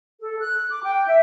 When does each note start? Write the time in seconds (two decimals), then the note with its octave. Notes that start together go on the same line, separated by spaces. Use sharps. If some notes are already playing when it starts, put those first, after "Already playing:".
0.20 A4
0.39 F#6
0.69 D6
0.84 G5
1.08 E5